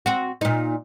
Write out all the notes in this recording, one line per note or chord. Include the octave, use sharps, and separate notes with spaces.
C4 F#4
A#2 D#4